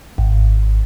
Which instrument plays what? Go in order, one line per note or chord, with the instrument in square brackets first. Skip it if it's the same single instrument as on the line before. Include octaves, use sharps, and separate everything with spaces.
[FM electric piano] G#1